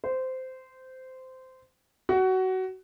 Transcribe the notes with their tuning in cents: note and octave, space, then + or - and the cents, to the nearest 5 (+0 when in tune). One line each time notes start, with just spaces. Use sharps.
C5 -15
F#4 +20